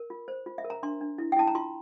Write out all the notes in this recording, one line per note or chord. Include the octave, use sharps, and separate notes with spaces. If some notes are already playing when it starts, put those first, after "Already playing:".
Already playing: A#4
F4
C5
F4
E5
A#4
A#5
D4 C6
D4
E4
G5
E4 A5
A#5
F4 C6